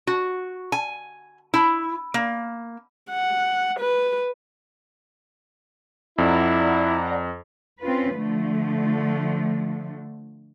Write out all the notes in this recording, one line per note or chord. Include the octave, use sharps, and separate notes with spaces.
F#4
G#5
E4
A#3
F#5
B4
F2 E4 D5 F#5 A#5
C4 C#4 F4 B4
D3 F3 A3